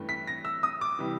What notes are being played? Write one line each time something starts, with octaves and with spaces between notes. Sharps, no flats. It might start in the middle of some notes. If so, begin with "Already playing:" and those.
Already playing: G2 E3 A3 C#4
B6
A#6
E6
D#6
D6
C3 E3 G3